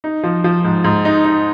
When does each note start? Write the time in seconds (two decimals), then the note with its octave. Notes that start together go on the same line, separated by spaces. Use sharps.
0.04 D#4
0.23 F3
0.44 F3
0.64 G#2
0.84 G#2
1.05 D#4
1.25 D#4